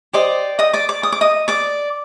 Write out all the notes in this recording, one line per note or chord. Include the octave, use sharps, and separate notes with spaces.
G4 C5 D5 D#5 D6
D#5 D#6
D5 D6
D5 D6
D#6
D6
D#5 D#6
D5 D6